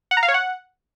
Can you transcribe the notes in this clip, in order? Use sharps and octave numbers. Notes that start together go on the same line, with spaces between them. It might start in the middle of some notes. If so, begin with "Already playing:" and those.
F#5
A#5
F5
C#5
F#5